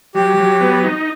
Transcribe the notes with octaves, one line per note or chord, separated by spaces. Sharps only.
F#3 G4
F#3
B3
D#4